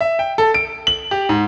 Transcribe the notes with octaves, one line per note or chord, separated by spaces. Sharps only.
E5
G5
A4
D7
F#7
G4
G#2